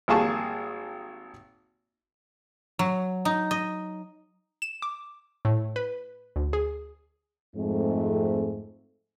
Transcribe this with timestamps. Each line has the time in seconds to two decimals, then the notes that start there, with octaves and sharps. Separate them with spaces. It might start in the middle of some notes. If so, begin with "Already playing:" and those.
0.08 G#1 G3 A#3 G#4 A5 C#6
2.79 F#3
3.25 D#4
3.51 D#5
4.62 E7
4.82 D6
5.45 A2
5.76 B4
6.36 D2
6.53 G#4
7.55 F2 G#2 G#3 A3 C4